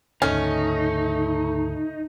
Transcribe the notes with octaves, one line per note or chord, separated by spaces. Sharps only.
D2 G#2 C#3 A3 C#4 D#4